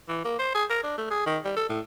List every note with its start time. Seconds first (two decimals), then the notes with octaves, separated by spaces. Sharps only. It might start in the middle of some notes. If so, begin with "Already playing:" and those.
0.09 E3
0.24 A#3
0.39 C5
0.55 G#4
0.70 A#4
0.83 D4
0.98 A3
1.10 G#4
1.26 D#3
1.45 G3
1.57 A4
1.69 A2